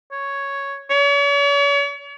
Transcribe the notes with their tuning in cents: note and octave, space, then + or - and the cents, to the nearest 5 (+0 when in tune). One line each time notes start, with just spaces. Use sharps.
C#5 +0
C#5 +40